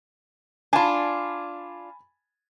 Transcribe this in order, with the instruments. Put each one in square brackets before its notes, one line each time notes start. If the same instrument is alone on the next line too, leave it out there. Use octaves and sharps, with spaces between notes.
[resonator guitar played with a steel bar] D4 F4 [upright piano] G#5 A5 B5